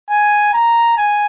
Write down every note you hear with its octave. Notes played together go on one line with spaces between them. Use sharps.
G#5
A#5
G#5